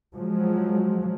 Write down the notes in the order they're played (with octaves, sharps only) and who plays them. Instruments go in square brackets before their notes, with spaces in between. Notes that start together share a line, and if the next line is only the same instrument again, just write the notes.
[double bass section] F3 F#3 G#3